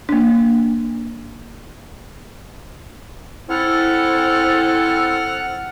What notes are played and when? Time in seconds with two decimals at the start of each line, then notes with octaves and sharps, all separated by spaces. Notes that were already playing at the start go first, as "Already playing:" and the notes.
0.09 A#3 D4
3.50 C4 E4 A4 F#5 F6